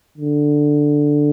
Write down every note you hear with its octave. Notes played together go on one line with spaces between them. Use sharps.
D3